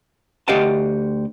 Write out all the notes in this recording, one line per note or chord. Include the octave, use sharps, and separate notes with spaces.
D2 G4 D#5 F5 F#5 A5